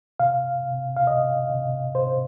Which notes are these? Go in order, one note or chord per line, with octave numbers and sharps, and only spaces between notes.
C3 F5
C3
F5
C3 D#5
C3
C3 C5